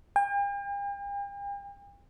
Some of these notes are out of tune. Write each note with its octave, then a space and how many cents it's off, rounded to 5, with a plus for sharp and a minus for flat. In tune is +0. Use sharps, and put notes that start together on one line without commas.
G5 +45